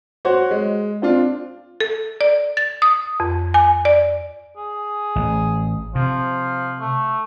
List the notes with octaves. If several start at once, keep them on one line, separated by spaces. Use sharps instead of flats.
F#4 C5 C#5 F#5
G#3
C4 D4 F4
A4
D5
A6
D#6
F2
G#5
D5
G#4
A1
C3 F3
A3